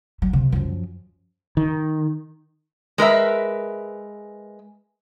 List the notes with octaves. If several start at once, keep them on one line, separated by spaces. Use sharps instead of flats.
F#3
C3
F#2 F3
D#3
G#3 A#4 B4 E5